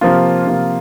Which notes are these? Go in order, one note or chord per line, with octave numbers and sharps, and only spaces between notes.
C3 F3 A#3 F4
C3 F3 A#3 F4